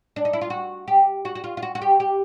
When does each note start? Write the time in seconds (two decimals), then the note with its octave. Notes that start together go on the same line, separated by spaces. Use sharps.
0.16 D4
0.25 D#4
0.33 E4
0.41 F4
0.50 F#4
0.88 G4
1.25 F#4
1.35 F#4
1.44 F4
1.57 F4
1.62 F#4
1.75 F#4
1.82 G4
2.00 G4